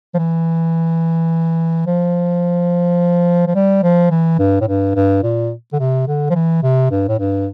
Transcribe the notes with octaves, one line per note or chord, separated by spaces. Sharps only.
F3
E3
F3
F3
G3
F3
E3
G2
A2
G2
G2
A#2
D3
C3
D3
F3
E3
C3
G2
A2
G2